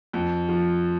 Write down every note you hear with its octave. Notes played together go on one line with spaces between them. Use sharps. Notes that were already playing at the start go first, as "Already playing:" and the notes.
F2
F3